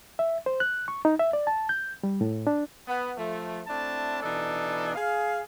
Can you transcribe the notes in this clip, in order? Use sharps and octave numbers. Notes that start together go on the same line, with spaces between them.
E5
C5
F#6
C#6
D#4
E5
D5
A5
G6
G3
A2
D4
B3
F3 A3
A3 C4 D4 E4 A5
B2 E3 D4 D#4 A4
G#4 F5